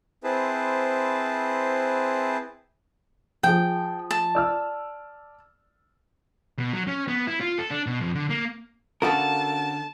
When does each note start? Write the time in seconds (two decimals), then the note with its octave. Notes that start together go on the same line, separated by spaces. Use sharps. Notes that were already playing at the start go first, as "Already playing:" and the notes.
0.24 C4 E4 G#4 B4 C5 A5
3.43 F3 G#4 G5
4.11 A5
4.35 D5 E6 F6
6.59 B2
6.73 F#3
6.87 C#4
7.08 B3
7.27 E4
7.41 F4
7.59 A4
7.70 D4
7.87 B2
8.01 F2
8.15 D3
8.30 A#3
9.02 D3 B3 C#4 F#4 A4 A#4 F5 A5